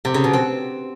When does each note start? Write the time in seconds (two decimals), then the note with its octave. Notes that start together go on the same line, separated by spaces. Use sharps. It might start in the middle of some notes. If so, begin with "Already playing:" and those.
0.05 C3
0.14 C#3
0.24 B2
0.33 C4